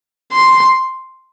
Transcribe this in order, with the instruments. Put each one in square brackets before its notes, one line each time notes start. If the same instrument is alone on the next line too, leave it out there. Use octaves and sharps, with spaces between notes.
[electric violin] C6